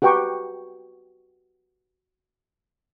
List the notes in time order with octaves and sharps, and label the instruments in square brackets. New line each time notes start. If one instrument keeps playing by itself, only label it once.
[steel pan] F#4 G4 B4 G5 A#5 C#6